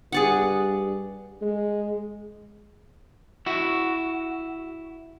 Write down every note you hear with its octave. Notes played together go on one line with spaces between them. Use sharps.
G2 G#4 D5 F#5
G#3
E4 F#4